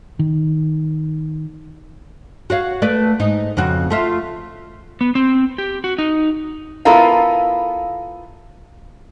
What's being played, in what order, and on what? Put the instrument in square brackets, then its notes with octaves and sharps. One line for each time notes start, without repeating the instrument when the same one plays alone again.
[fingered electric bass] D#3
[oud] F#4 C#5 F5
A3 B4 D5
G#2 D#4
F2 C#3 F#4
A3 F4 E5
[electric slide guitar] B3
C4
G4
F#4
D#4
[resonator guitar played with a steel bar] B3 E4 F4 A4 A#4 F5